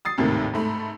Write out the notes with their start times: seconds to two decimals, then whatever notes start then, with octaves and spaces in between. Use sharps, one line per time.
0.05 D#6 A6 C7
0.18 G#1 D#2 A2 C3 D#3
0.54 G#2 A3 B5